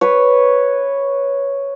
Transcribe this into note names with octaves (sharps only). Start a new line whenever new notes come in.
B4 C#5